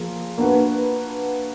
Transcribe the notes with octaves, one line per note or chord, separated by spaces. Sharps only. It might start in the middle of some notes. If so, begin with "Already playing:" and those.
Already playing: F3 A#3 F4 G#4
A#3 D4 F#4 B4